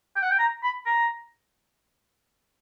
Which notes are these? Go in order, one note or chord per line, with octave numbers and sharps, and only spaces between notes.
G5
F#5
G5
A#5
B5
A#5